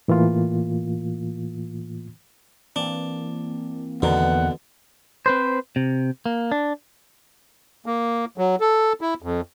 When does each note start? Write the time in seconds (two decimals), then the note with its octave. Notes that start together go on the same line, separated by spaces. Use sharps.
0.08 A2 E3 A#3 F4
2.76 E3 A#3 C4 D4
4.02 E2 B2 D3 D#3 F#5
5.26 C4 B4 C5
5.76 C3
6.26 A#3
6.52 D4
7.86 A#3
8.38 F#3
8.60 A4
9.01 E4
9.22 F2